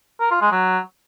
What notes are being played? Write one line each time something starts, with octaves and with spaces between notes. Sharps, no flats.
A#4
F4
G#3
F#3